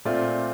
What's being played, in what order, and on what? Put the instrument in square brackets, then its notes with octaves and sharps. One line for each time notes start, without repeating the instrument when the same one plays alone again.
[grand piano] A#2 A3 C4 F4 D5